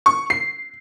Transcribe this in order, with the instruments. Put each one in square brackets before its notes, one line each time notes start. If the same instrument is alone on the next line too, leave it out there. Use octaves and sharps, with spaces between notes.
[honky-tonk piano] C#6
C7